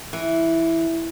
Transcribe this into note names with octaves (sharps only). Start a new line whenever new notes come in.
E3